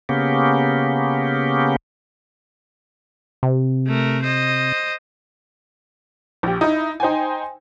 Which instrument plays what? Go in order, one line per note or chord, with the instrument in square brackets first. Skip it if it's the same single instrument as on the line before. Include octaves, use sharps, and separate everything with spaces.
[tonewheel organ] C#3 A#3 B3 C#4 G4
[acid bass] C3
[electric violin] A3 A#4
C5 D#5
[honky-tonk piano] A#1 G4
D#4 E4
D#4 C5 G5 G#5